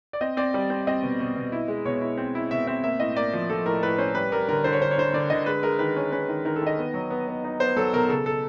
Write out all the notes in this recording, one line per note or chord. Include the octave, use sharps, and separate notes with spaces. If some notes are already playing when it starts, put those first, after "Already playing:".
D5
C4 D#5
C4 D5
G3
C4
C4 D#5
B2
B2
B2
E4
G#3
B2 C#5
E4
C4
E4
B2 E5
C4 E5
A#3 E5
A2 D#5
A#3 D5
F3
F3 A4
A2 A#4
A2 B4
C#4 C5
G3 B4
G3 A#4
D3 A#4
D3 C5
C#5
D3 C5
C#5
D3 C5
D3 D5
D3 D#5
G#3 B4
G#3 A#4
D#3 B4
C#4
C#4 B4
D#3
D#3 A#4
A4
D#3 D#5
B3
F#3
B3
B3
D#4
B3 C5
F#3 A4
B2 A#4
C#3 A4
A4